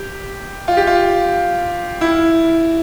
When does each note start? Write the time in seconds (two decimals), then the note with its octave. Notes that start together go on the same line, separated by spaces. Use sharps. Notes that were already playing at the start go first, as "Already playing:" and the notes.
Already playing: G4
0.68 F4
0.77 G4
0.87 F4
2.01 E4